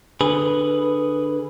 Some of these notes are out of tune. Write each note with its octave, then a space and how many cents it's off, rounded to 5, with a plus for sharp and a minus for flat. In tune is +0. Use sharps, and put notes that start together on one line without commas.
D3 +15 G#4 +0 B4 +0